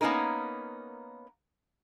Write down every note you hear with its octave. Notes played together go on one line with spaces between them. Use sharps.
A#3 B3 C#4 D#4 A#4